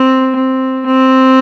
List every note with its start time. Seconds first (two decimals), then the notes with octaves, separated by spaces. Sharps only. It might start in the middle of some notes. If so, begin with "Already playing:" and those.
Already playing: C4
0.36 C4
0.86 C4